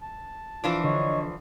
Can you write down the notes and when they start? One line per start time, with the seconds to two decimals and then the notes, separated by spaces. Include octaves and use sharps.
0.01 A5
0.64 E3 F3 D4 F4 D6
0.84 D3 C#5 D#5 C#6